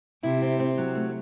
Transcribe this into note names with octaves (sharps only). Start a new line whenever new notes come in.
C3 E4
C4
C4
F#3
A3